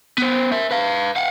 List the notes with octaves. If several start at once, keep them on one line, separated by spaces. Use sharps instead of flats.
B3 C5
A#4 E5
B4 F5
F5 F#5